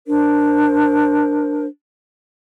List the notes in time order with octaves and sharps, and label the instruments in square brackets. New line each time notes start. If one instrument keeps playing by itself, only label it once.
[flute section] D4 A#4 C5